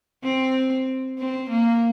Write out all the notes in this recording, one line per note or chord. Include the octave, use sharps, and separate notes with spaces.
C4
C4
A#3